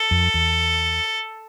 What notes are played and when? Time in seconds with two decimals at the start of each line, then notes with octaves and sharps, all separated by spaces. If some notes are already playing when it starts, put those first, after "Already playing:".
Already playing: A4
0.11 F2
0.34 E2